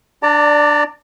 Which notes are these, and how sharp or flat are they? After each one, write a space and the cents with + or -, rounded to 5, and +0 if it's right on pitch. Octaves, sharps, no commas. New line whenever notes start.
D4 +5 D5 +0 A#5 -45